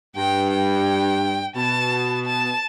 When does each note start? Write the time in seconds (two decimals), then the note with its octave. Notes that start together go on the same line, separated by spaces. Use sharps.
0.16 G2 G5
0.51 G5
1.56 B2 A5
2.26 A5